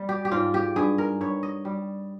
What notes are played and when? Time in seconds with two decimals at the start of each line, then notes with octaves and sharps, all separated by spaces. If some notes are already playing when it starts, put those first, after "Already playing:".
Already playing: G3
0.09 G4
0.25 G4
0.31 G#2 F4
0.54 G4
0.76 G2 G#4
0.98 A#4
1.21 G2 C#5
1.43 D#5
1.65 G3